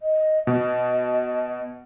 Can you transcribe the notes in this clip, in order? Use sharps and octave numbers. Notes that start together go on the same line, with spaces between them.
D#5
B2 D#5